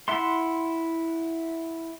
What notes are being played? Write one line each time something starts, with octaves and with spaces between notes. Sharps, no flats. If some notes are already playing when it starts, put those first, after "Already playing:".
E4 E5 F#5 C6